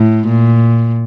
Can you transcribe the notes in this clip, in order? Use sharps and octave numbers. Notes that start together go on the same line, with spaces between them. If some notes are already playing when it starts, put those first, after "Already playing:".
Already playing: A2
A#2